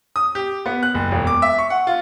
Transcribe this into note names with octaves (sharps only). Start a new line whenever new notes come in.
D#6
G4
B3
F#6
F#1
E1
D6
E5
C#6
F#5
F4